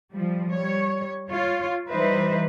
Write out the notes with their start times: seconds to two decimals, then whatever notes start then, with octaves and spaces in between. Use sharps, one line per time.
0.13 F3 G3
0.53 G3 C#5
1.30 F4 C#5
1.89 E3 G3 D#4 B4 C5 E5